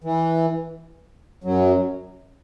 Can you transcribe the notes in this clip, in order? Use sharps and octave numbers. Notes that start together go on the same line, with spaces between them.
E3
F#2 F#3